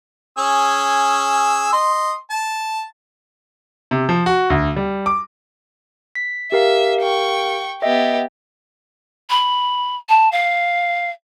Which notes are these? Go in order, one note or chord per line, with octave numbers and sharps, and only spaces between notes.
C#4 G#4 E6
D#5 C6
A5
C3
F3
F#4
D2
G3
D6
B6
G4 A#4 E5 F5
G5 C#6
B3 G4 D#5 E5
B5
A5
F5